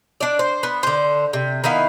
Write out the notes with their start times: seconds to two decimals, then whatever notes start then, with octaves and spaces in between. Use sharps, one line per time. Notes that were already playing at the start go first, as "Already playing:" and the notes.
0.20 D4 D5
0.39 C5
0.63 B3
0.83 D3 C5
1.33 C3
1.64 D#3 B3 E4 F5